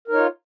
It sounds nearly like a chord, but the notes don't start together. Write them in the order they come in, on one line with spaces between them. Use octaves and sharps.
A#4 D#4 C#5 F4